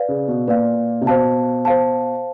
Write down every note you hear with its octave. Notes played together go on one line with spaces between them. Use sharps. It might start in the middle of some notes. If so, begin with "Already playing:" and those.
Already playing: B4 D5 F5
C#3
B2
A#2 B4 D5 F5
C3
B2 C5 F5 A5
C5 F5 A5